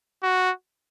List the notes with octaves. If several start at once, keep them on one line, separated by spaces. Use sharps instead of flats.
F#4